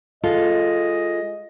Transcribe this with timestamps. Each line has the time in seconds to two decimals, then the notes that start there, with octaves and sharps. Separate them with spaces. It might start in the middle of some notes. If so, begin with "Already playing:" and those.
0.24 G#3 F4 A4 D#5